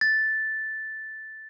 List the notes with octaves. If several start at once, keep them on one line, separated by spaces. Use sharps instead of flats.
A6